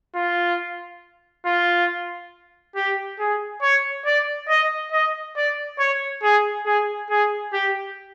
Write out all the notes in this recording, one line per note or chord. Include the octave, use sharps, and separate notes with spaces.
F4
F4
G4
G#4
C#5
D5
D#5
D#5
D5
C#5
G#4
G#4
G#4
G4